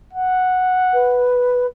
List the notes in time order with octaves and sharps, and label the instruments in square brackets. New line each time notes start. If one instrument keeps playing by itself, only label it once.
[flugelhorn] F#5
[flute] B4